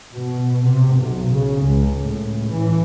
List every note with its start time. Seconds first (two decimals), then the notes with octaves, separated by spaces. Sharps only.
0.11 B2
0.64 C3
0.95 B1
1.32 C#3
1.62 C#2
2.00 A2
2.51 E3